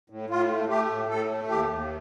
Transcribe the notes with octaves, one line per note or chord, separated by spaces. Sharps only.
A2
A2 F4
A3
A3 G4
A2
A2 A4
A3
D#2 G4
D#2